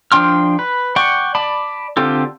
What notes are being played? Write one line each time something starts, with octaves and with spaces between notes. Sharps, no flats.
F3 D4 G5 C6 F6
B4
D5 F#5 G5 C#6
D5 A5 B5
D3 C4 F4 G4 A4